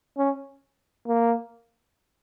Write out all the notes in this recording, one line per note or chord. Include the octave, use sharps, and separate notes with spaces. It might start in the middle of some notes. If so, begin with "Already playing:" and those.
C#4
A#3